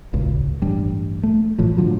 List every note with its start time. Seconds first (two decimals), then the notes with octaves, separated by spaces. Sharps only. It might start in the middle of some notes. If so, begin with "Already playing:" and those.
0.13 D#1 G#1 C#2 C#3
0.62 A1 G2 G3
1.23 A3
1.59 G1 A2 E3 F3
1.77 A2 D3 F3 F#3